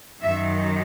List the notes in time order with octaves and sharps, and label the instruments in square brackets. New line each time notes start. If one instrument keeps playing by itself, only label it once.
[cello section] F#2 D#3 F#3 E5